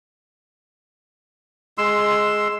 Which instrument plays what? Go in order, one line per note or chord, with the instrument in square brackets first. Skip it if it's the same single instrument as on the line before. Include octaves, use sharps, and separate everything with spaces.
[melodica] G#3 C6 E6